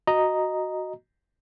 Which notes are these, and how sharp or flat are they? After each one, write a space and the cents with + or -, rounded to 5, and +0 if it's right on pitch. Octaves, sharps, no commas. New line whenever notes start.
F#4 +0 D#5 +0 A#5 +0